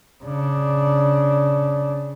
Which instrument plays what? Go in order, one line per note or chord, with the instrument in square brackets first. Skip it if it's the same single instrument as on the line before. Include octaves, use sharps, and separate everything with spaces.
[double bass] C#3 D4